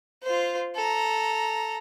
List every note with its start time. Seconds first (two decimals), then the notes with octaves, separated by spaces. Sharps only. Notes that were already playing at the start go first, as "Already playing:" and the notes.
0.23 F4 C5
0.75 A4 A#5